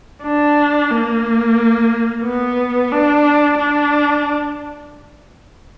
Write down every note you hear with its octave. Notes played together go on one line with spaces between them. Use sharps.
D4
A#3
B3
D4
D4